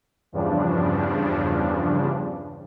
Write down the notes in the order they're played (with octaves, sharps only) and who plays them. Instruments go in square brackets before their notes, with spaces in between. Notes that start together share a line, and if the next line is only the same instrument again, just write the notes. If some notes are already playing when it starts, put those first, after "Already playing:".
[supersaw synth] E2 G2 C#3 F3 D4